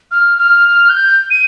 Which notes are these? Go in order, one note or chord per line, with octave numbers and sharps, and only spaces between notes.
F6
F6
G6
D#7